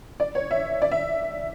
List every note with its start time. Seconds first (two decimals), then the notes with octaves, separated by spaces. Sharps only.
0.20 D5
0.35 C#5
0.51 E5
0.82 D5
0.91 E5